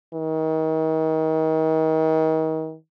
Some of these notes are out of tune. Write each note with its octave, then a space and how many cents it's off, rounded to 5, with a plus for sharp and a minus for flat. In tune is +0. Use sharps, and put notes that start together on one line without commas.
D#3 +35